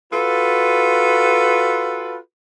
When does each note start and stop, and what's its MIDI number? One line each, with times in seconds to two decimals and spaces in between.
0.13 2.17 65
0.13 2.17 66
0.13 2.17 69
0.13 2.17 71